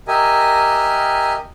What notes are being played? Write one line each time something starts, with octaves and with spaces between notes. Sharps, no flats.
G4 A#4 D#5 E5 G#5